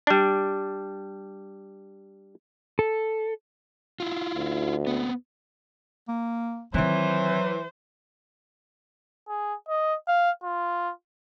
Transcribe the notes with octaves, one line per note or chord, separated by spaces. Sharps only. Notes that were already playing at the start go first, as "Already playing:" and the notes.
G3 D4
A4
E4 F4
D2
B3 C4
A#3
D#3 E3 F#3 C4 C5
G#4
D#5
F5
F4